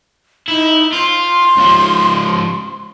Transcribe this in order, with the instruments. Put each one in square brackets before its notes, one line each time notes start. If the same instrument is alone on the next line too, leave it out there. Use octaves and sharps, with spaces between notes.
[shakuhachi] D#4 [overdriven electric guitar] E4
[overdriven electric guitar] F4 [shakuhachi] C6
[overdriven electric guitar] C#2 F3